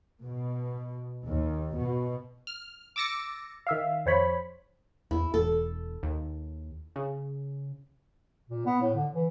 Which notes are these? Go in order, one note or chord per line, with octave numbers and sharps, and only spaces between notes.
B2
D#2
B2
F6
D6 E6 A6 A#6 C#7
D#3 E5 F5
F2 C5 C#5 B5
E2 E4
E1 A4
D#2
C#3
A#2
B3
A2
D3
E3